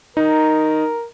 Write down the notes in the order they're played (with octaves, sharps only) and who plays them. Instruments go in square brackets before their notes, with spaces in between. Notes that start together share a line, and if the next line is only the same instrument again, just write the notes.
[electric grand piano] D#4 [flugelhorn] A#4